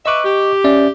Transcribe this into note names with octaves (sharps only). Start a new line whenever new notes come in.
B4 D#5 E5 C#6 D6
G4
C#4 D5 E5